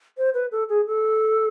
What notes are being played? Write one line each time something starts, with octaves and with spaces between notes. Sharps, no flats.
C5
B4
A4
G#4
A4